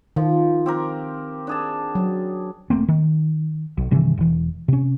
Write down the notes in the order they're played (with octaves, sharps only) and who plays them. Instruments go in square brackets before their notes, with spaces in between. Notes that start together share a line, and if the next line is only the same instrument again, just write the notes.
[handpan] D#3 [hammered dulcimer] F3
[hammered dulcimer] C4 G4 A#4
D4 G#4 A5
[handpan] F#3
[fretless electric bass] E1 A3 A#3 C4
D#3
B1
G2 C3 D#3 E3
E1 E3
C3 C#4